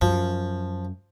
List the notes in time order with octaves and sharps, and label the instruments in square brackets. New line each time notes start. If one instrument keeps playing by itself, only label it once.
[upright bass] F#2 [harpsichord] F3